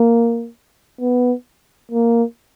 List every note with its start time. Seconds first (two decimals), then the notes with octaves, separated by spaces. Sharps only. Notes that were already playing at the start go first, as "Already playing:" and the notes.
Already playing: A#3
1.01 B3
1.92 A#3